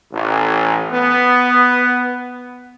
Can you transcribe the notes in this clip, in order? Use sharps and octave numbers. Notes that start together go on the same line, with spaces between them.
A1
B3